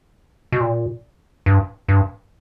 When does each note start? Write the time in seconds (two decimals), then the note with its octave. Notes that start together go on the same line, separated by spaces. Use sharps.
0.52 B2
0.61 A#2
1.46 G2
1.89 G2